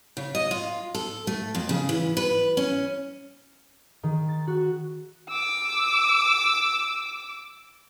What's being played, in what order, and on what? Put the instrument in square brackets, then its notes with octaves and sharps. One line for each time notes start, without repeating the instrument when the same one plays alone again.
[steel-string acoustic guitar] C#3
D#5
F4
A4
A3
F2
C#3
E3
B4
C#4
[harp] D#3
A6
F#4
[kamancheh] D6 E6